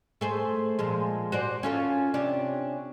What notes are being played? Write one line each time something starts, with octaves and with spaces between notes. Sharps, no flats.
A3 G#4 C5
A#2 F3 G#3
F#4 C5 D5
C#4 F4 A4
C3 C#4 D4